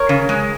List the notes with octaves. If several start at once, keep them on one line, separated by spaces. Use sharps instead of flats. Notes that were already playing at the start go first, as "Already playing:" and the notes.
Already playing: A#4 C#5
C#3
G#3